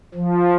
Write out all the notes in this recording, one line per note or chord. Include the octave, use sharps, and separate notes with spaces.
F3